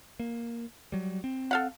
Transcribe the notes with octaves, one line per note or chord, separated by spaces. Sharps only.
A#3
F#3 G3
C4
A4 F5 F#5